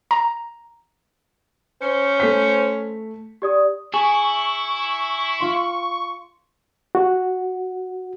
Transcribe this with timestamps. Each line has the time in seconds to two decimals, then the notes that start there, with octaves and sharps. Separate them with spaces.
0.11 A#5
1.82 C#4 C5 C#7
2.20 A3 B6
3.42 G4 D5 D#6
3.94 E4 G#4 C#6
5.40 F4 C6
6.95 F#4